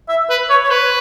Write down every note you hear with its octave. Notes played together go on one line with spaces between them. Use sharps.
E5
B4
C#5
C#5
B4